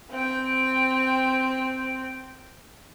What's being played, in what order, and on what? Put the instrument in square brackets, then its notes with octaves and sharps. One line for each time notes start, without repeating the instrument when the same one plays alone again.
[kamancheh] C4 G5